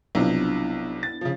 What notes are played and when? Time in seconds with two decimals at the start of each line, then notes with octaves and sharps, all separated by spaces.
0.15 B1 C3 F3 B3 D4 E4
1.03 A6
1.21 C#3 F3